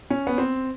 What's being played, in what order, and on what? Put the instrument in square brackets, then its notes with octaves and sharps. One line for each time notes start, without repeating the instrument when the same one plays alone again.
[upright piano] C#4
B3
C4